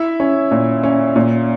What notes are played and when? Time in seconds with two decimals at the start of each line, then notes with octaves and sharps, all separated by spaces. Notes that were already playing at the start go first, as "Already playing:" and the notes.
Already playing: E4 E5
0.20 C#4
0.51 A#2
0.83 C#4
1.16 A#2